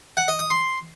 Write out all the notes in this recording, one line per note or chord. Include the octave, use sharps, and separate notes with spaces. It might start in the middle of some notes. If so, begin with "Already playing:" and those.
F#5
D#5
D#6
C6